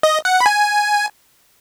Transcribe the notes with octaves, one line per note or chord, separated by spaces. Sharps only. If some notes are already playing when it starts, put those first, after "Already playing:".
D#5
F#5
B5
G#5